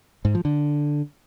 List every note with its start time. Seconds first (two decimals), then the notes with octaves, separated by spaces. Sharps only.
0.25 G#2
0.35 F3
0.45 D3